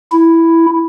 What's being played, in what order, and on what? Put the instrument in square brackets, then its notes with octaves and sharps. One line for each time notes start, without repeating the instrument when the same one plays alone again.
[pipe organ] E4